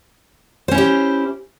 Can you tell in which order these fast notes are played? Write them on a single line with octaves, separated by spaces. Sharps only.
C5 C#4 E4 G4